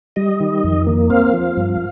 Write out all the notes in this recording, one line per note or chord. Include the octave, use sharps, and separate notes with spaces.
G3 D#5
D#3
F2
A#3
C4 F5
F3
G2